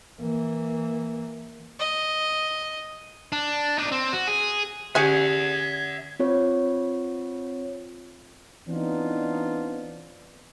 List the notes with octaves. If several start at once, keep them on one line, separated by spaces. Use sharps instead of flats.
E3 A#3
D#5
D4
D4 D#4
C4
F#4
G#4
D3 C#4 G4 G#4 E5 F#5 G#5 G#6
C4 F4 C#5
E3 B3 C4 D4 D#4 F4